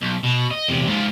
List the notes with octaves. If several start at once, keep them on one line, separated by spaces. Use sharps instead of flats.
B1
B2
D#5
E2 C3
G#2 F4